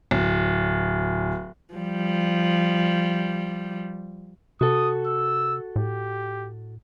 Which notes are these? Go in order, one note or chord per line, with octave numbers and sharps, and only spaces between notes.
D1
F3 G3
C3 F#4 A4 D#6
E6
A2 G4